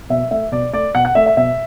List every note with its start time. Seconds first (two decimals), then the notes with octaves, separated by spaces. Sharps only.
0.10 B2 E5
0.31 A3 E5
0.52 B2 D5
0.73 A3 D5
0.95 B2 F#5
1.05 F#5
1.15 A3 E5
1.26 E5
1.37 B2 E5